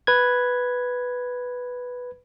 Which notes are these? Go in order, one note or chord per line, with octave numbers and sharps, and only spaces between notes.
B4 G#6